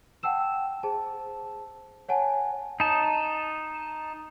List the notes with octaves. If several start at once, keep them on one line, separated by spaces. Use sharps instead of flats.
F#5 G5 A5 E6 E7
G#4 C5 A5
C#5 F#5 G#5 A5
D#4 A5